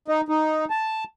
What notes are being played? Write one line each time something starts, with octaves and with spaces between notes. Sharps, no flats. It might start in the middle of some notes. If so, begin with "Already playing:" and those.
D#4
D#4
A5